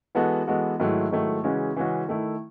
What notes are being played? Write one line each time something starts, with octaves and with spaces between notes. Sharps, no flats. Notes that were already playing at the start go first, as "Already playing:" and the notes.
E3 G#3 B3 F#4 A4
E3 G#3 B3 F#4 A4
G#2 D#3 F#3 A3 E4
G#2 D#3 F#3 A3 E4
C#3 E3 G#3 C#4 F#4
C#3 E3 G#3 C#4 F#4
D#3 A3 E4